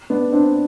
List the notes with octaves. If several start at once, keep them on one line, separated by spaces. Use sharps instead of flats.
B3 D4
C4 D4